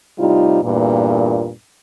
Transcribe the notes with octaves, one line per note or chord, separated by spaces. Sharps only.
A2 C3 G3 D#4 F4
E2 G2 A#2